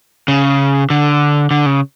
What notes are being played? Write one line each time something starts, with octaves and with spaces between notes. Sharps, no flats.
C#3
D3
D3
C#3